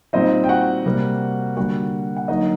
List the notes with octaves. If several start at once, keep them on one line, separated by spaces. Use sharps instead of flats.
A#2 G3 C4 D#4 D#5
G5
F#4 F#5
C3 G3 A#3
D3 G3 A#3 F#4 F#5
F#5
D3 F#3 A#3 D#4 D#5